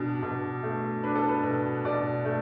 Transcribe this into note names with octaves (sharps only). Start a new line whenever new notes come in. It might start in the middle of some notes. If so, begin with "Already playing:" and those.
Already playing: B2 D4
B2
A3
D4 B4
A4
B4
B2
B2 D5
A3